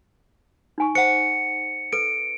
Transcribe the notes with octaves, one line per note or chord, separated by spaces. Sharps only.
D#4 G#5 C#6
C5 F#5 C#7
A4 B4 D7